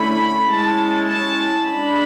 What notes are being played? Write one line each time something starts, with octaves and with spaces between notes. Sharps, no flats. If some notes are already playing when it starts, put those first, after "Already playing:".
Already playing: D3 A3 C#4 E4 B5
G#3 C#4 E4 A5
A5
G#3 D4 B5